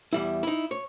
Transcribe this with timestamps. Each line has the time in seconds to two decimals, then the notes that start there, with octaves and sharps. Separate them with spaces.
0.13 E2 G3 E4
0.43 D#4 E4
0.71 C#5